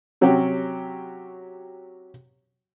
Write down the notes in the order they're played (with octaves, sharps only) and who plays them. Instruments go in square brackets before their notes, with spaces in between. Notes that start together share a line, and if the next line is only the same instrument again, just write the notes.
[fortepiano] C3 F#3 C#4 F#4 G4